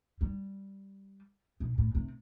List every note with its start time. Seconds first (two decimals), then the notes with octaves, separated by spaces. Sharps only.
0.21 G3
1.60 B2
1.78 A2
1.95 C3